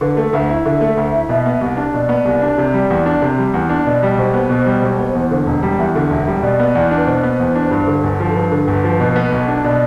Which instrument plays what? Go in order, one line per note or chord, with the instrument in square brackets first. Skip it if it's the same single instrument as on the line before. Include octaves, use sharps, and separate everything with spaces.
[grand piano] D3 [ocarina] B4
[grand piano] A3
[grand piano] D2 [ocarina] E5
[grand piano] E4
[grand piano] D3 [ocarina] E5
[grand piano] A3
D2
E4
B2
B3
C2
D4
[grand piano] B2 [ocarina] D5
[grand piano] B3
C2
D4
C3
G3
E2
D4
C3
G3
E2
D4
[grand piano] B2 [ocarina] D5
[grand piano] G3
[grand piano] B1 [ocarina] C5
[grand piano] B3
B2
G3
B1
B3
E2
D3
E1
G3
[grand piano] E2 [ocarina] E5
[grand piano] D3
E1
G3
[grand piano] B2 [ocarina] D5
[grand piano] B3
E2
D4
[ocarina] B4
[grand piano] B2 [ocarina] C5
[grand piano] B3
E2
D4
G2
D3
G1
F3
[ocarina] A4
[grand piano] G2 [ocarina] B4
[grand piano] D3
G1
F3
B2
B3
B1
D4
[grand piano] B2 [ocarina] D5